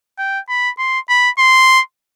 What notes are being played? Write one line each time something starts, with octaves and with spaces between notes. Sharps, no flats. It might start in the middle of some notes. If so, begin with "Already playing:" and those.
G5
B5
C6
B5
C6